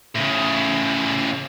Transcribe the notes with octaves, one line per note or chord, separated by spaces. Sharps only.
A2 C#3